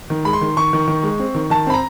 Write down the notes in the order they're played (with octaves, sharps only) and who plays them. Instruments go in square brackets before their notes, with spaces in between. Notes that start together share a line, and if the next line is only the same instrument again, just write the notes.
[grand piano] D#3
G#3 B5
C6
D#3
D#3 C#6
D#3
D#3
G#3
C4
D#3
D#3 A5
C4 B5
A#5